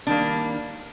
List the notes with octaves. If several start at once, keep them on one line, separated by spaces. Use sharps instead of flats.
D#3 G3 A#3 D4